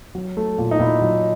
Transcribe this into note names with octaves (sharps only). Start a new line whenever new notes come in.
F#3
A3
A#2
D#4
A#2 E4
F#3